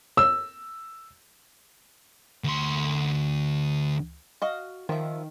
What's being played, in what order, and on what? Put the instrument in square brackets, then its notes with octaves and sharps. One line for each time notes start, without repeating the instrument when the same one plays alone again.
[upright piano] E6
[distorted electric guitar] D2 C6
[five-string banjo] F#4 D#5 F5
[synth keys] D#3 [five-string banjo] F3 E5